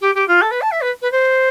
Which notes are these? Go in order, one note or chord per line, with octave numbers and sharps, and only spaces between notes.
G4
G4
F4
A4
B4
A5
E5
B4
B4
C5